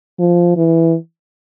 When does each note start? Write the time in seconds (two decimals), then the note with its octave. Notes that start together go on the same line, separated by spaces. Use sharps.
0.19 F3
0.57 E3